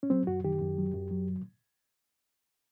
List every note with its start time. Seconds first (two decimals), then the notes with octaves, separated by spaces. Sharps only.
0.03 C#4
0.10 F#3 C4
0.27 F#2 F#4
0.44 D#3 G4
0.62 F#2
0.78 F#3
0.94 F#2
1.11 F#3